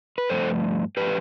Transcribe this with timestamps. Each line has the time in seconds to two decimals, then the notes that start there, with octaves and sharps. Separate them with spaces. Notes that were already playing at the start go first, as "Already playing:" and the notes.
0.18 B4
0.29 G2 F3 A3 A4 C5
0.97 F3 A3 G4 B4